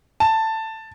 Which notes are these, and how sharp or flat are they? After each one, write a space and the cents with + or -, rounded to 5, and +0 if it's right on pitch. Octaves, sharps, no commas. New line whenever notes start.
A5 +10